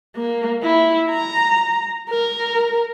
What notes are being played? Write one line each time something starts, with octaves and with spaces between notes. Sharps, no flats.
A#3
E4
A#5
A#4